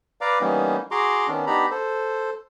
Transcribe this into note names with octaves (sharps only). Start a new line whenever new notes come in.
B4 D5 F5 A#5 D6
E3 G3 A#3 B3 C#4 D#4
F#4 G#4 A#5 C6 D6
D#3 B3 C#4 D4
B3 D4 D#4 G4 A#5 B5
A4 C5